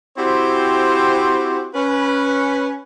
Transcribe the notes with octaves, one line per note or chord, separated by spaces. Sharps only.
C4 E4 F#4 G4 C5
C#4 B4